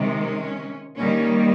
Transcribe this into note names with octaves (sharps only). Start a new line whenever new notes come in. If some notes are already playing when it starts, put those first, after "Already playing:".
Already playing: C3 D#3 G#3
C#4
D#3 G3 A#3 C#4